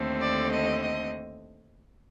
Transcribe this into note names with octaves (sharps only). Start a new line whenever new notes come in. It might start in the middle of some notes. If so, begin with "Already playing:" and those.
Already playing: D#2 D3 A3 C4
D5
D#5
D#5